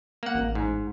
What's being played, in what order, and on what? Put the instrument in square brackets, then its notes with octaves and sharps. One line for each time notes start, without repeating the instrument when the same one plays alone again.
[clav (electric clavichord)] A#3 F#5
[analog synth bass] A1
[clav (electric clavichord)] G#2